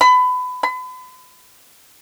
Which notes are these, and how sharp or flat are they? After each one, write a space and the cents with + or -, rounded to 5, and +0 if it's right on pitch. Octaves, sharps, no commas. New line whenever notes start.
B5 +25
B5 +40